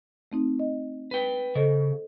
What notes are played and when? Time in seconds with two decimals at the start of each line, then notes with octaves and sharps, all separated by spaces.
0.32 A3 C4 D#4
0.59 D#5
1.11 B4 G5
1.55 C#3 A4 C5 D#5